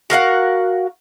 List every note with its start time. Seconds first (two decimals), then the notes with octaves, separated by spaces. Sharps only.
0.10 F#4 A#4 F5 F#5